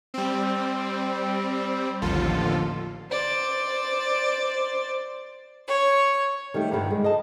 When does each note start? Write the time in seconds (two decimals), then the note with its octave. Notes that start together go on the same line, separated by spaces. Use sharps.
0.14 G3 C4
2.02 A1 D#2 D3 F3 F4 A4
3.11 C5 D5
5.68 C#5
6.54 D#3 G3 A3 G4
6.71 G2 A#2 D3 D#3 G3
6.91 G#3
7.03 F#2 D#5 A5